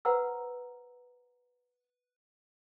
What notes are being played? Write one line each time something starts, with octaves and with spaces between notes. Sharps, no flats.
B4 C5 F#5 A#5 B5 E6